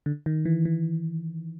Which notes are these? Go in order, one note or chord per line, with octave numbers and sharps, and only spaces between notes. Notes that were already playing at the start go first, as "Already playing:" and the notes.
D3
D#3
E3
E3